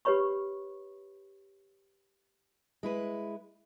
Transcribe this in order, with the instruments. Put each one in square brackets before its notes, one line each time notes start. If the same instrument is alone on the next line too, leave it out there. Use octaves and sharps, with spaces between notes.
[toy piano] G4 B4 C#5 B5 C#6
[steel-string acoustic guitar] G#3 E4 B4